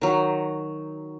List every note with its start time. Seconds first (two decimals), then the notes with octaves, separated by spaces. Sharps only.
0.01 D#3 F#3